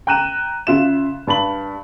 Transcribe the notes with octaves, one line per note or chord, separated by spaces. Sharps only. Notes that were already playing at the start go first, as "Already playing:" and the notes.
G5 A#5 F#6 D#7 E7
C#3 F4 E5 E7
G2 A5 B5 F#7